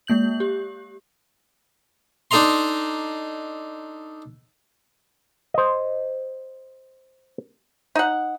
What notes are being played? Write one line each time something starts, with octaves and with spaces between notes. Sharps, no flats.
G#3 A#3 G6 F#7
G4
D4 D#4 A4 D#5 A#5 C6
C5 D#5
D#4 F#5